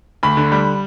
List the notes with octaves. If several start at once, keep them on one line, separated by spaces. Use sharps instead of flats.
D2 B5
D3
G3